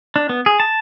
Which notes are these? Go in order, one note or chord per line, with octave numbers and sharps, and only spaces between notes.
D4
B3
G#4
A5